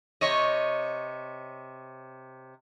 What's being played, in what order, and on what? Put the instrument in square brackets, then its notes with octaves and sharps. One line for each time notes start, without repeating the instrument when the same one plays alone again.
[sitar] C3 C#5 D#5